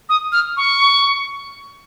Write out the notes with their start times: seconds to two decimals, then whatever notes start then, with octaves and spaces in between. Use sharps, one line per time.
0.09 D#6
0.32 F6
0.57 C#6